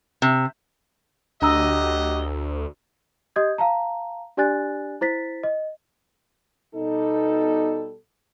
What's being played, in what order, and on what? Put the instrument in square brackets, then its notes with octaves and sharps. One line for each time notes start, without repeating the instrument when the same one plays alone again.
[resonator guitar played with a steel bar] C3
[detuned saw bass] D2 [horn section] F#3 G4 D#5 [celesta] D4 A#5 E6
[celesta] G4 D#5 D#6 G6 G#6
F5 A5 A#5
D4 G4 D5 G#5 F#6 A6
E4 C5 A6 B6
D#5
[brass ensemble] B2 G3 A4 [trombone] D#4